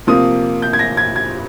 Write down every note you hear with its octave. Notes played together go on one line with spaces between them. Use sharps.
C3 F3 A#3 D#6
G6
G#6
A#6
G#6
G#6